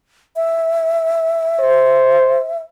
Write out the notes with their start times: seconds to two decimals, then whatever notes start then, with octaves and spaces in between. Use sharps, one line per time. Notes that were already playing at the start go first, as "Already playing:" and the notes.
0.36 E5
1.60 C5